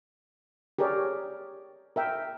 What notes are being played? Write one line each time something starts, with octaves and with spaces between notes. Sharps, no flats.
G4 G#4 A#4 C#5 D5
A#4 E5 G5